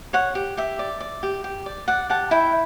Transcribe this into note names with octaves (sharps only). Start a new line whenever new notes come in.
C#5 F#5
G4
G4 E5
D5
D5
G4
G4
D5
D5 F#5
G4 F#5 A5
E4 E5 G5